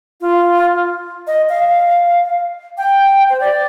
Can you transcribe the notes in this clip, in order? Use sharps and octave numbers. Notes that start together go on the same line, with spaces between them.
F4
D#5
F5
G5
C5
D5